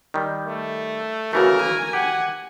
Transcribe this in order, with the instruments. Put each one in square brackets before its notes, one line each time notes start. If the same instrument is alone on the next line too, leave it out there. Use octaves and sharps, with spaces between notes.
[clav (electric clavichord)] D#3 G3
[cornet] A3
[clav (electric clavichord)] C#3 E3 A3 [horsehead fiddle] F#4 [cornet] A#4
[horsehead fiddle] G#5
[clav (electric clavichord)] G4 [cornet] F#5